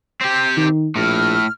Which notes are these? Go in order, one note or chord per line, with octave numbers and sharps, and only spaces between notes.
C4 G4 G6
D#3
A#1 A2 F6